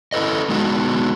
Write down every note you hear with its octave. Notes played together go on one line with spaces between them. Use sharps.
E4 A4 B4 D#5
G#3 B3 D#4 F#4